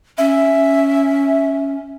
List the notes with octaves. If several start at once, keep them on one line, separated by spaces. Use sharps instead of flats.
C#4 E5